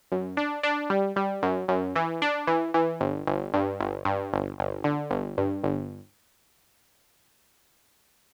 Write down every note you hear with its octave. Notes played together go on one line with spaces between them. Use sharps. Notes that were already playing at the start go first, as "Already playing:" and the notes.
F#2
D4
D4
G3
G3
F#2
F#2
E3
D4
E3
E3
G1
G1
G2
G1
G2
G1
G1
D3
G1
G2
G1